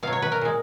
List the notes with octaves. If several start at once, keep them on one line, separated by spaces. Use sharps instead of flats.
B2 F#3 F5
C#5
B4
A#4
A#2 G#3